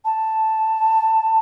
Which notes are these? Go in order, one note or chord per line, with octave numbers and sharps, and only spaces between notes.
A5